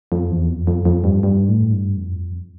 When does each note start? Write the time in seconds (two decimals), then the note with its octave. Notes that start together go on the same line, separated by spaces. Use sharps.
0.12 F2
0.30 E2
0.49 F2
0.67 F2
0.85 F2
1.04 G2
1.23 G2
1.48 A2
1.73 G2
1.97 F2